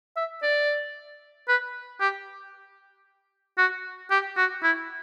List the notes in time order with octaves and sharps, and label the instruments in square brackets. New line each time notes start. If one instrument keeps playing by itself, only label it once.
[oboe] E5
D5
B4
G4
F#4
G4
F#4
E4